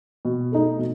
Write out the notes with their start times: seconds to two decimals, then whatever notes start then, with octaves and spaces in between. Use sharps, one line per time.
0.25 B2
0.52 A3 D#4 A4
0.79 B2